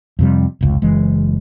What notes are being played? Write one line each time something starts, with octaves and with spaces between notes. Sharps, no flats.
F2 C3 G3
F1 C#2
F#1 E3 G#3